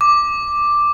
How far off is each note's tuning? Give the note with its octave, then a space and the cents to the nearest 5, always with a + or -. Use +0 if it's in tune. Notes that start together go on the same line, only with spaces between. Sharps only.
D6 +5